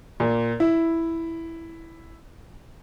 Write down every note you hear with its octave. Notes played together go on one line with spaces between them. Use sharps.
A#2
E4